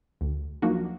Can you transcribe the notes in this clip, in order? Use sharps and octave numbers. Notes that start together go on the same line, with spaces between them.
D2
F3 F#3 A#3 D4 D#4 F#4